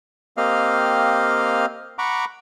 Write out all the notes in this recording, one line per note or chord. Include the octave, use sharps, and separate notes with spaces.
A#3 C4 G4 D#5 F5 F6
F#5 A#5 B5 C#6 D6